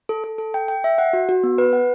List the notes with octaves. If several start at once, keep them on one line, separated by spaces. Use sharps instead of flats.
A4
A4
A4
G5
G5
E5
F#5
F#4
F#4
B3
B4
F#5